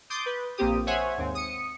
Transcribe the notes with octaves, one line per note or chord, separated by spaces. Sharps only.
C6 D6 D#6 G6 A6
B4
A#1 A#3 C4 G4 D#6
C5 C#5 E5 F#5 G#5
D#2 G#2 C4
D#6 C#7